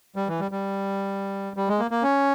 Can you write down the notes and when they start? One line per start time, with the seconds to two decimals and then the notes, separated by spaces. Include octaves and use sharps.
0.16 G3
0.28 E3
0.40 G3
0.51 G3
1.57 G3
1.68 G#3
1.80 A#3
1.91 A#3
2.03 C#4